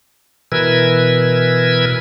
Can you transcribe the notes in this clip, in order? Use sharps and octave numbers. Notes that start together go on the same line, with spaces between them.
B2 E3 A#4 B4 E6 G#6